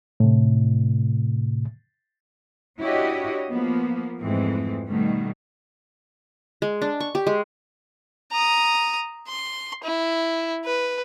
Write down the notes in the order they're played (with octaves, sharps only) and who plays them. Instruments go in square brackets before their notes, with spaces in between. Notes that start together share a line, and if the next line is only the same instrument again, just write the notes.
[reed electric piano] A2 C3
[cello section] D4 E4 F#4 G4 C#5 D#5
F3 A#3 B3
F2 G#2 E3 G#3 A3 C4
B2 D#3 G3 A3
[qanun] G#3
D4
C#6
G4
G#3
[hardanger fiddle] A#5 D#6
C6
E4
B4